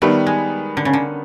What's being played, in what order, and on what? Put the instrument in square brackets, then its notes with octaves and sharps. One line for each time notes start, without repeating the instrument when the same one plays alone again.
[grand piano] D#3 G3 B3 [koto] A3
[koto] G#3
D3
C#3
D3